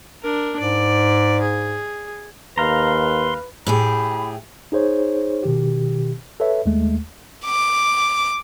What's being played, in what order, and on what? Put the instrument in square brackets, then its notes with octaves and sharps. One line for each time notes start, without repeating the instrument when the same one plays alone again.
[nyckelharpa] D4 A#4
[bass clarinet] G#2 [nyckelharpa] D5
[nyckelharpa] G#4
[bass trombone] D#2 [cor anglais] B4 [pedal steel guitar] F5 A#5 [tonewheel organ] C6
[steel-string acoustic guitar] A2 G4 G#4 [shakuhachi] B5
[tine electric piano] D#4 G#4 C5 C#5
B2 D#3 G4
A4 B4 C#5 E5
D#2 G#3 A3
[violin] D6